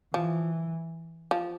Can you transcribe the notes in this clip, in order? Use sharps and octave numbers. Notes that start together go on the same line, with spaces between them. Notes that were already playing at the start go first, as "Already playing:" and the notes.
E3 F3
F3